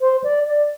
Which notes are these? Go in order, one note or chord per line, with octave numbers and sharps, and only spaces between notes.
C5
D5
D5